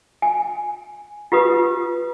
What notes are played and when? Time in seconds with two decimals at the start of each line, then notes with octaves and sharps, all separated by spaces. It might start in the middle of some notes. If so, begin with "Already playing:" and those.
0.22 G#5
1.32 F4 G4 B4 D#6